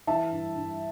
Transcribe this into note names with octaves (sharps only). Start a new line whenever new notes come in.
E3 E5 A5
G2
G2